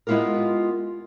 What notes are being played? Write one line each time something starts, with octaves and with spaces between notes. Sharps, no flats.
G#3 B3 E4 F4 G4 A#4